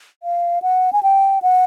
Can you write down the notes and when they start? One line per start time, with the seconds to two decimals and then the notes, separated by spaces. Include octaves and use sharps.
0.23 F5
0.62 F#5
0.93 G#5
1.03 G5
1.42 F#5